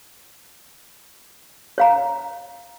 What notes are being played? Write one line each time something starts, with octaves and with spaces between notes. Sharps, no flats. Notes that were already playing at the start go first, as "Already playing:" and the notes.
C#5 F5 A#5